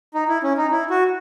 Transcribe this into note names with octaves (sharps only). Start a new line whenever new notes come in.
D#4
E4
C#4
D#4
E4
F#4